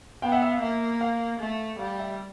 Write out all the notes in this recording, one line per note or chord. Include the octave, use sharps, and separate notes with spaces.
B3 F5 G5
E5 F#5
E5
F5
A#3 E5
F5
A3
G3 F5
E5